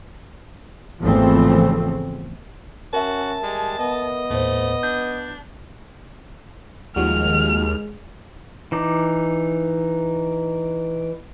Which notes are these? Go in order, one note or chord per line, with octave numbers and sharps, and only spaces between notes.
G#1 E2 C#3 F3 A3 C4
C#4 F#4 A#4 E5 A5
G3 G#3
B3 D#5
D#2 A2 A3 C5
D4 G6
D#2 F3 G3 G#3 F#4 F6
E3 D#4 D6